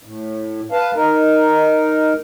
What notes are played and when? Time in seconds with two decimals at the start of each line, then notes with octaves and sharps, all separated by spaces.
0.03 A2
0.72 B4 F5 A5
0.95 D#4 A#4